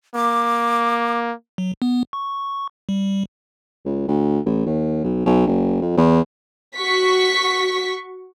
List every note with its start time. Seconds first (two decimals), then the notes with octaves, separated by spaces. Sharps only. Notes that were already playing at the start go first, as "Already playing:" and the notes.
0.15 A#3 D6
1.58 F#3
1.82 B3
2.13 C#6
2.89 G3
3.85 C#2
4.08 D2
4.45 A1
4.66 D#2
5.04 B1
5.26 B1
5.47 F#1
5.81 F2
5.97 E2
6.76 F#4 C#6 B6